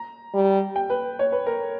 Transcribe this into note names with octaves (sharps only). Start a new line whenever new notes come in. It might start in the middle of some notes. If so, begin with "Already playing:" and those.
Already playing: A#5
G3
G5
B4
C#5
B4
A#4